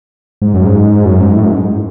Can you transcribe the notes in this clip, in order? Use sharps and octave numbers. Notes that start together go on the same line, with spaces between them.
G#2
F#2
G#2
F#2
G#2
A2
F#2
G#2